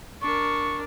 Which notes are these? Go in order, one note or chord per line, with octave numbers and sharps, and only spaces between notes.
D4 A#4 C#6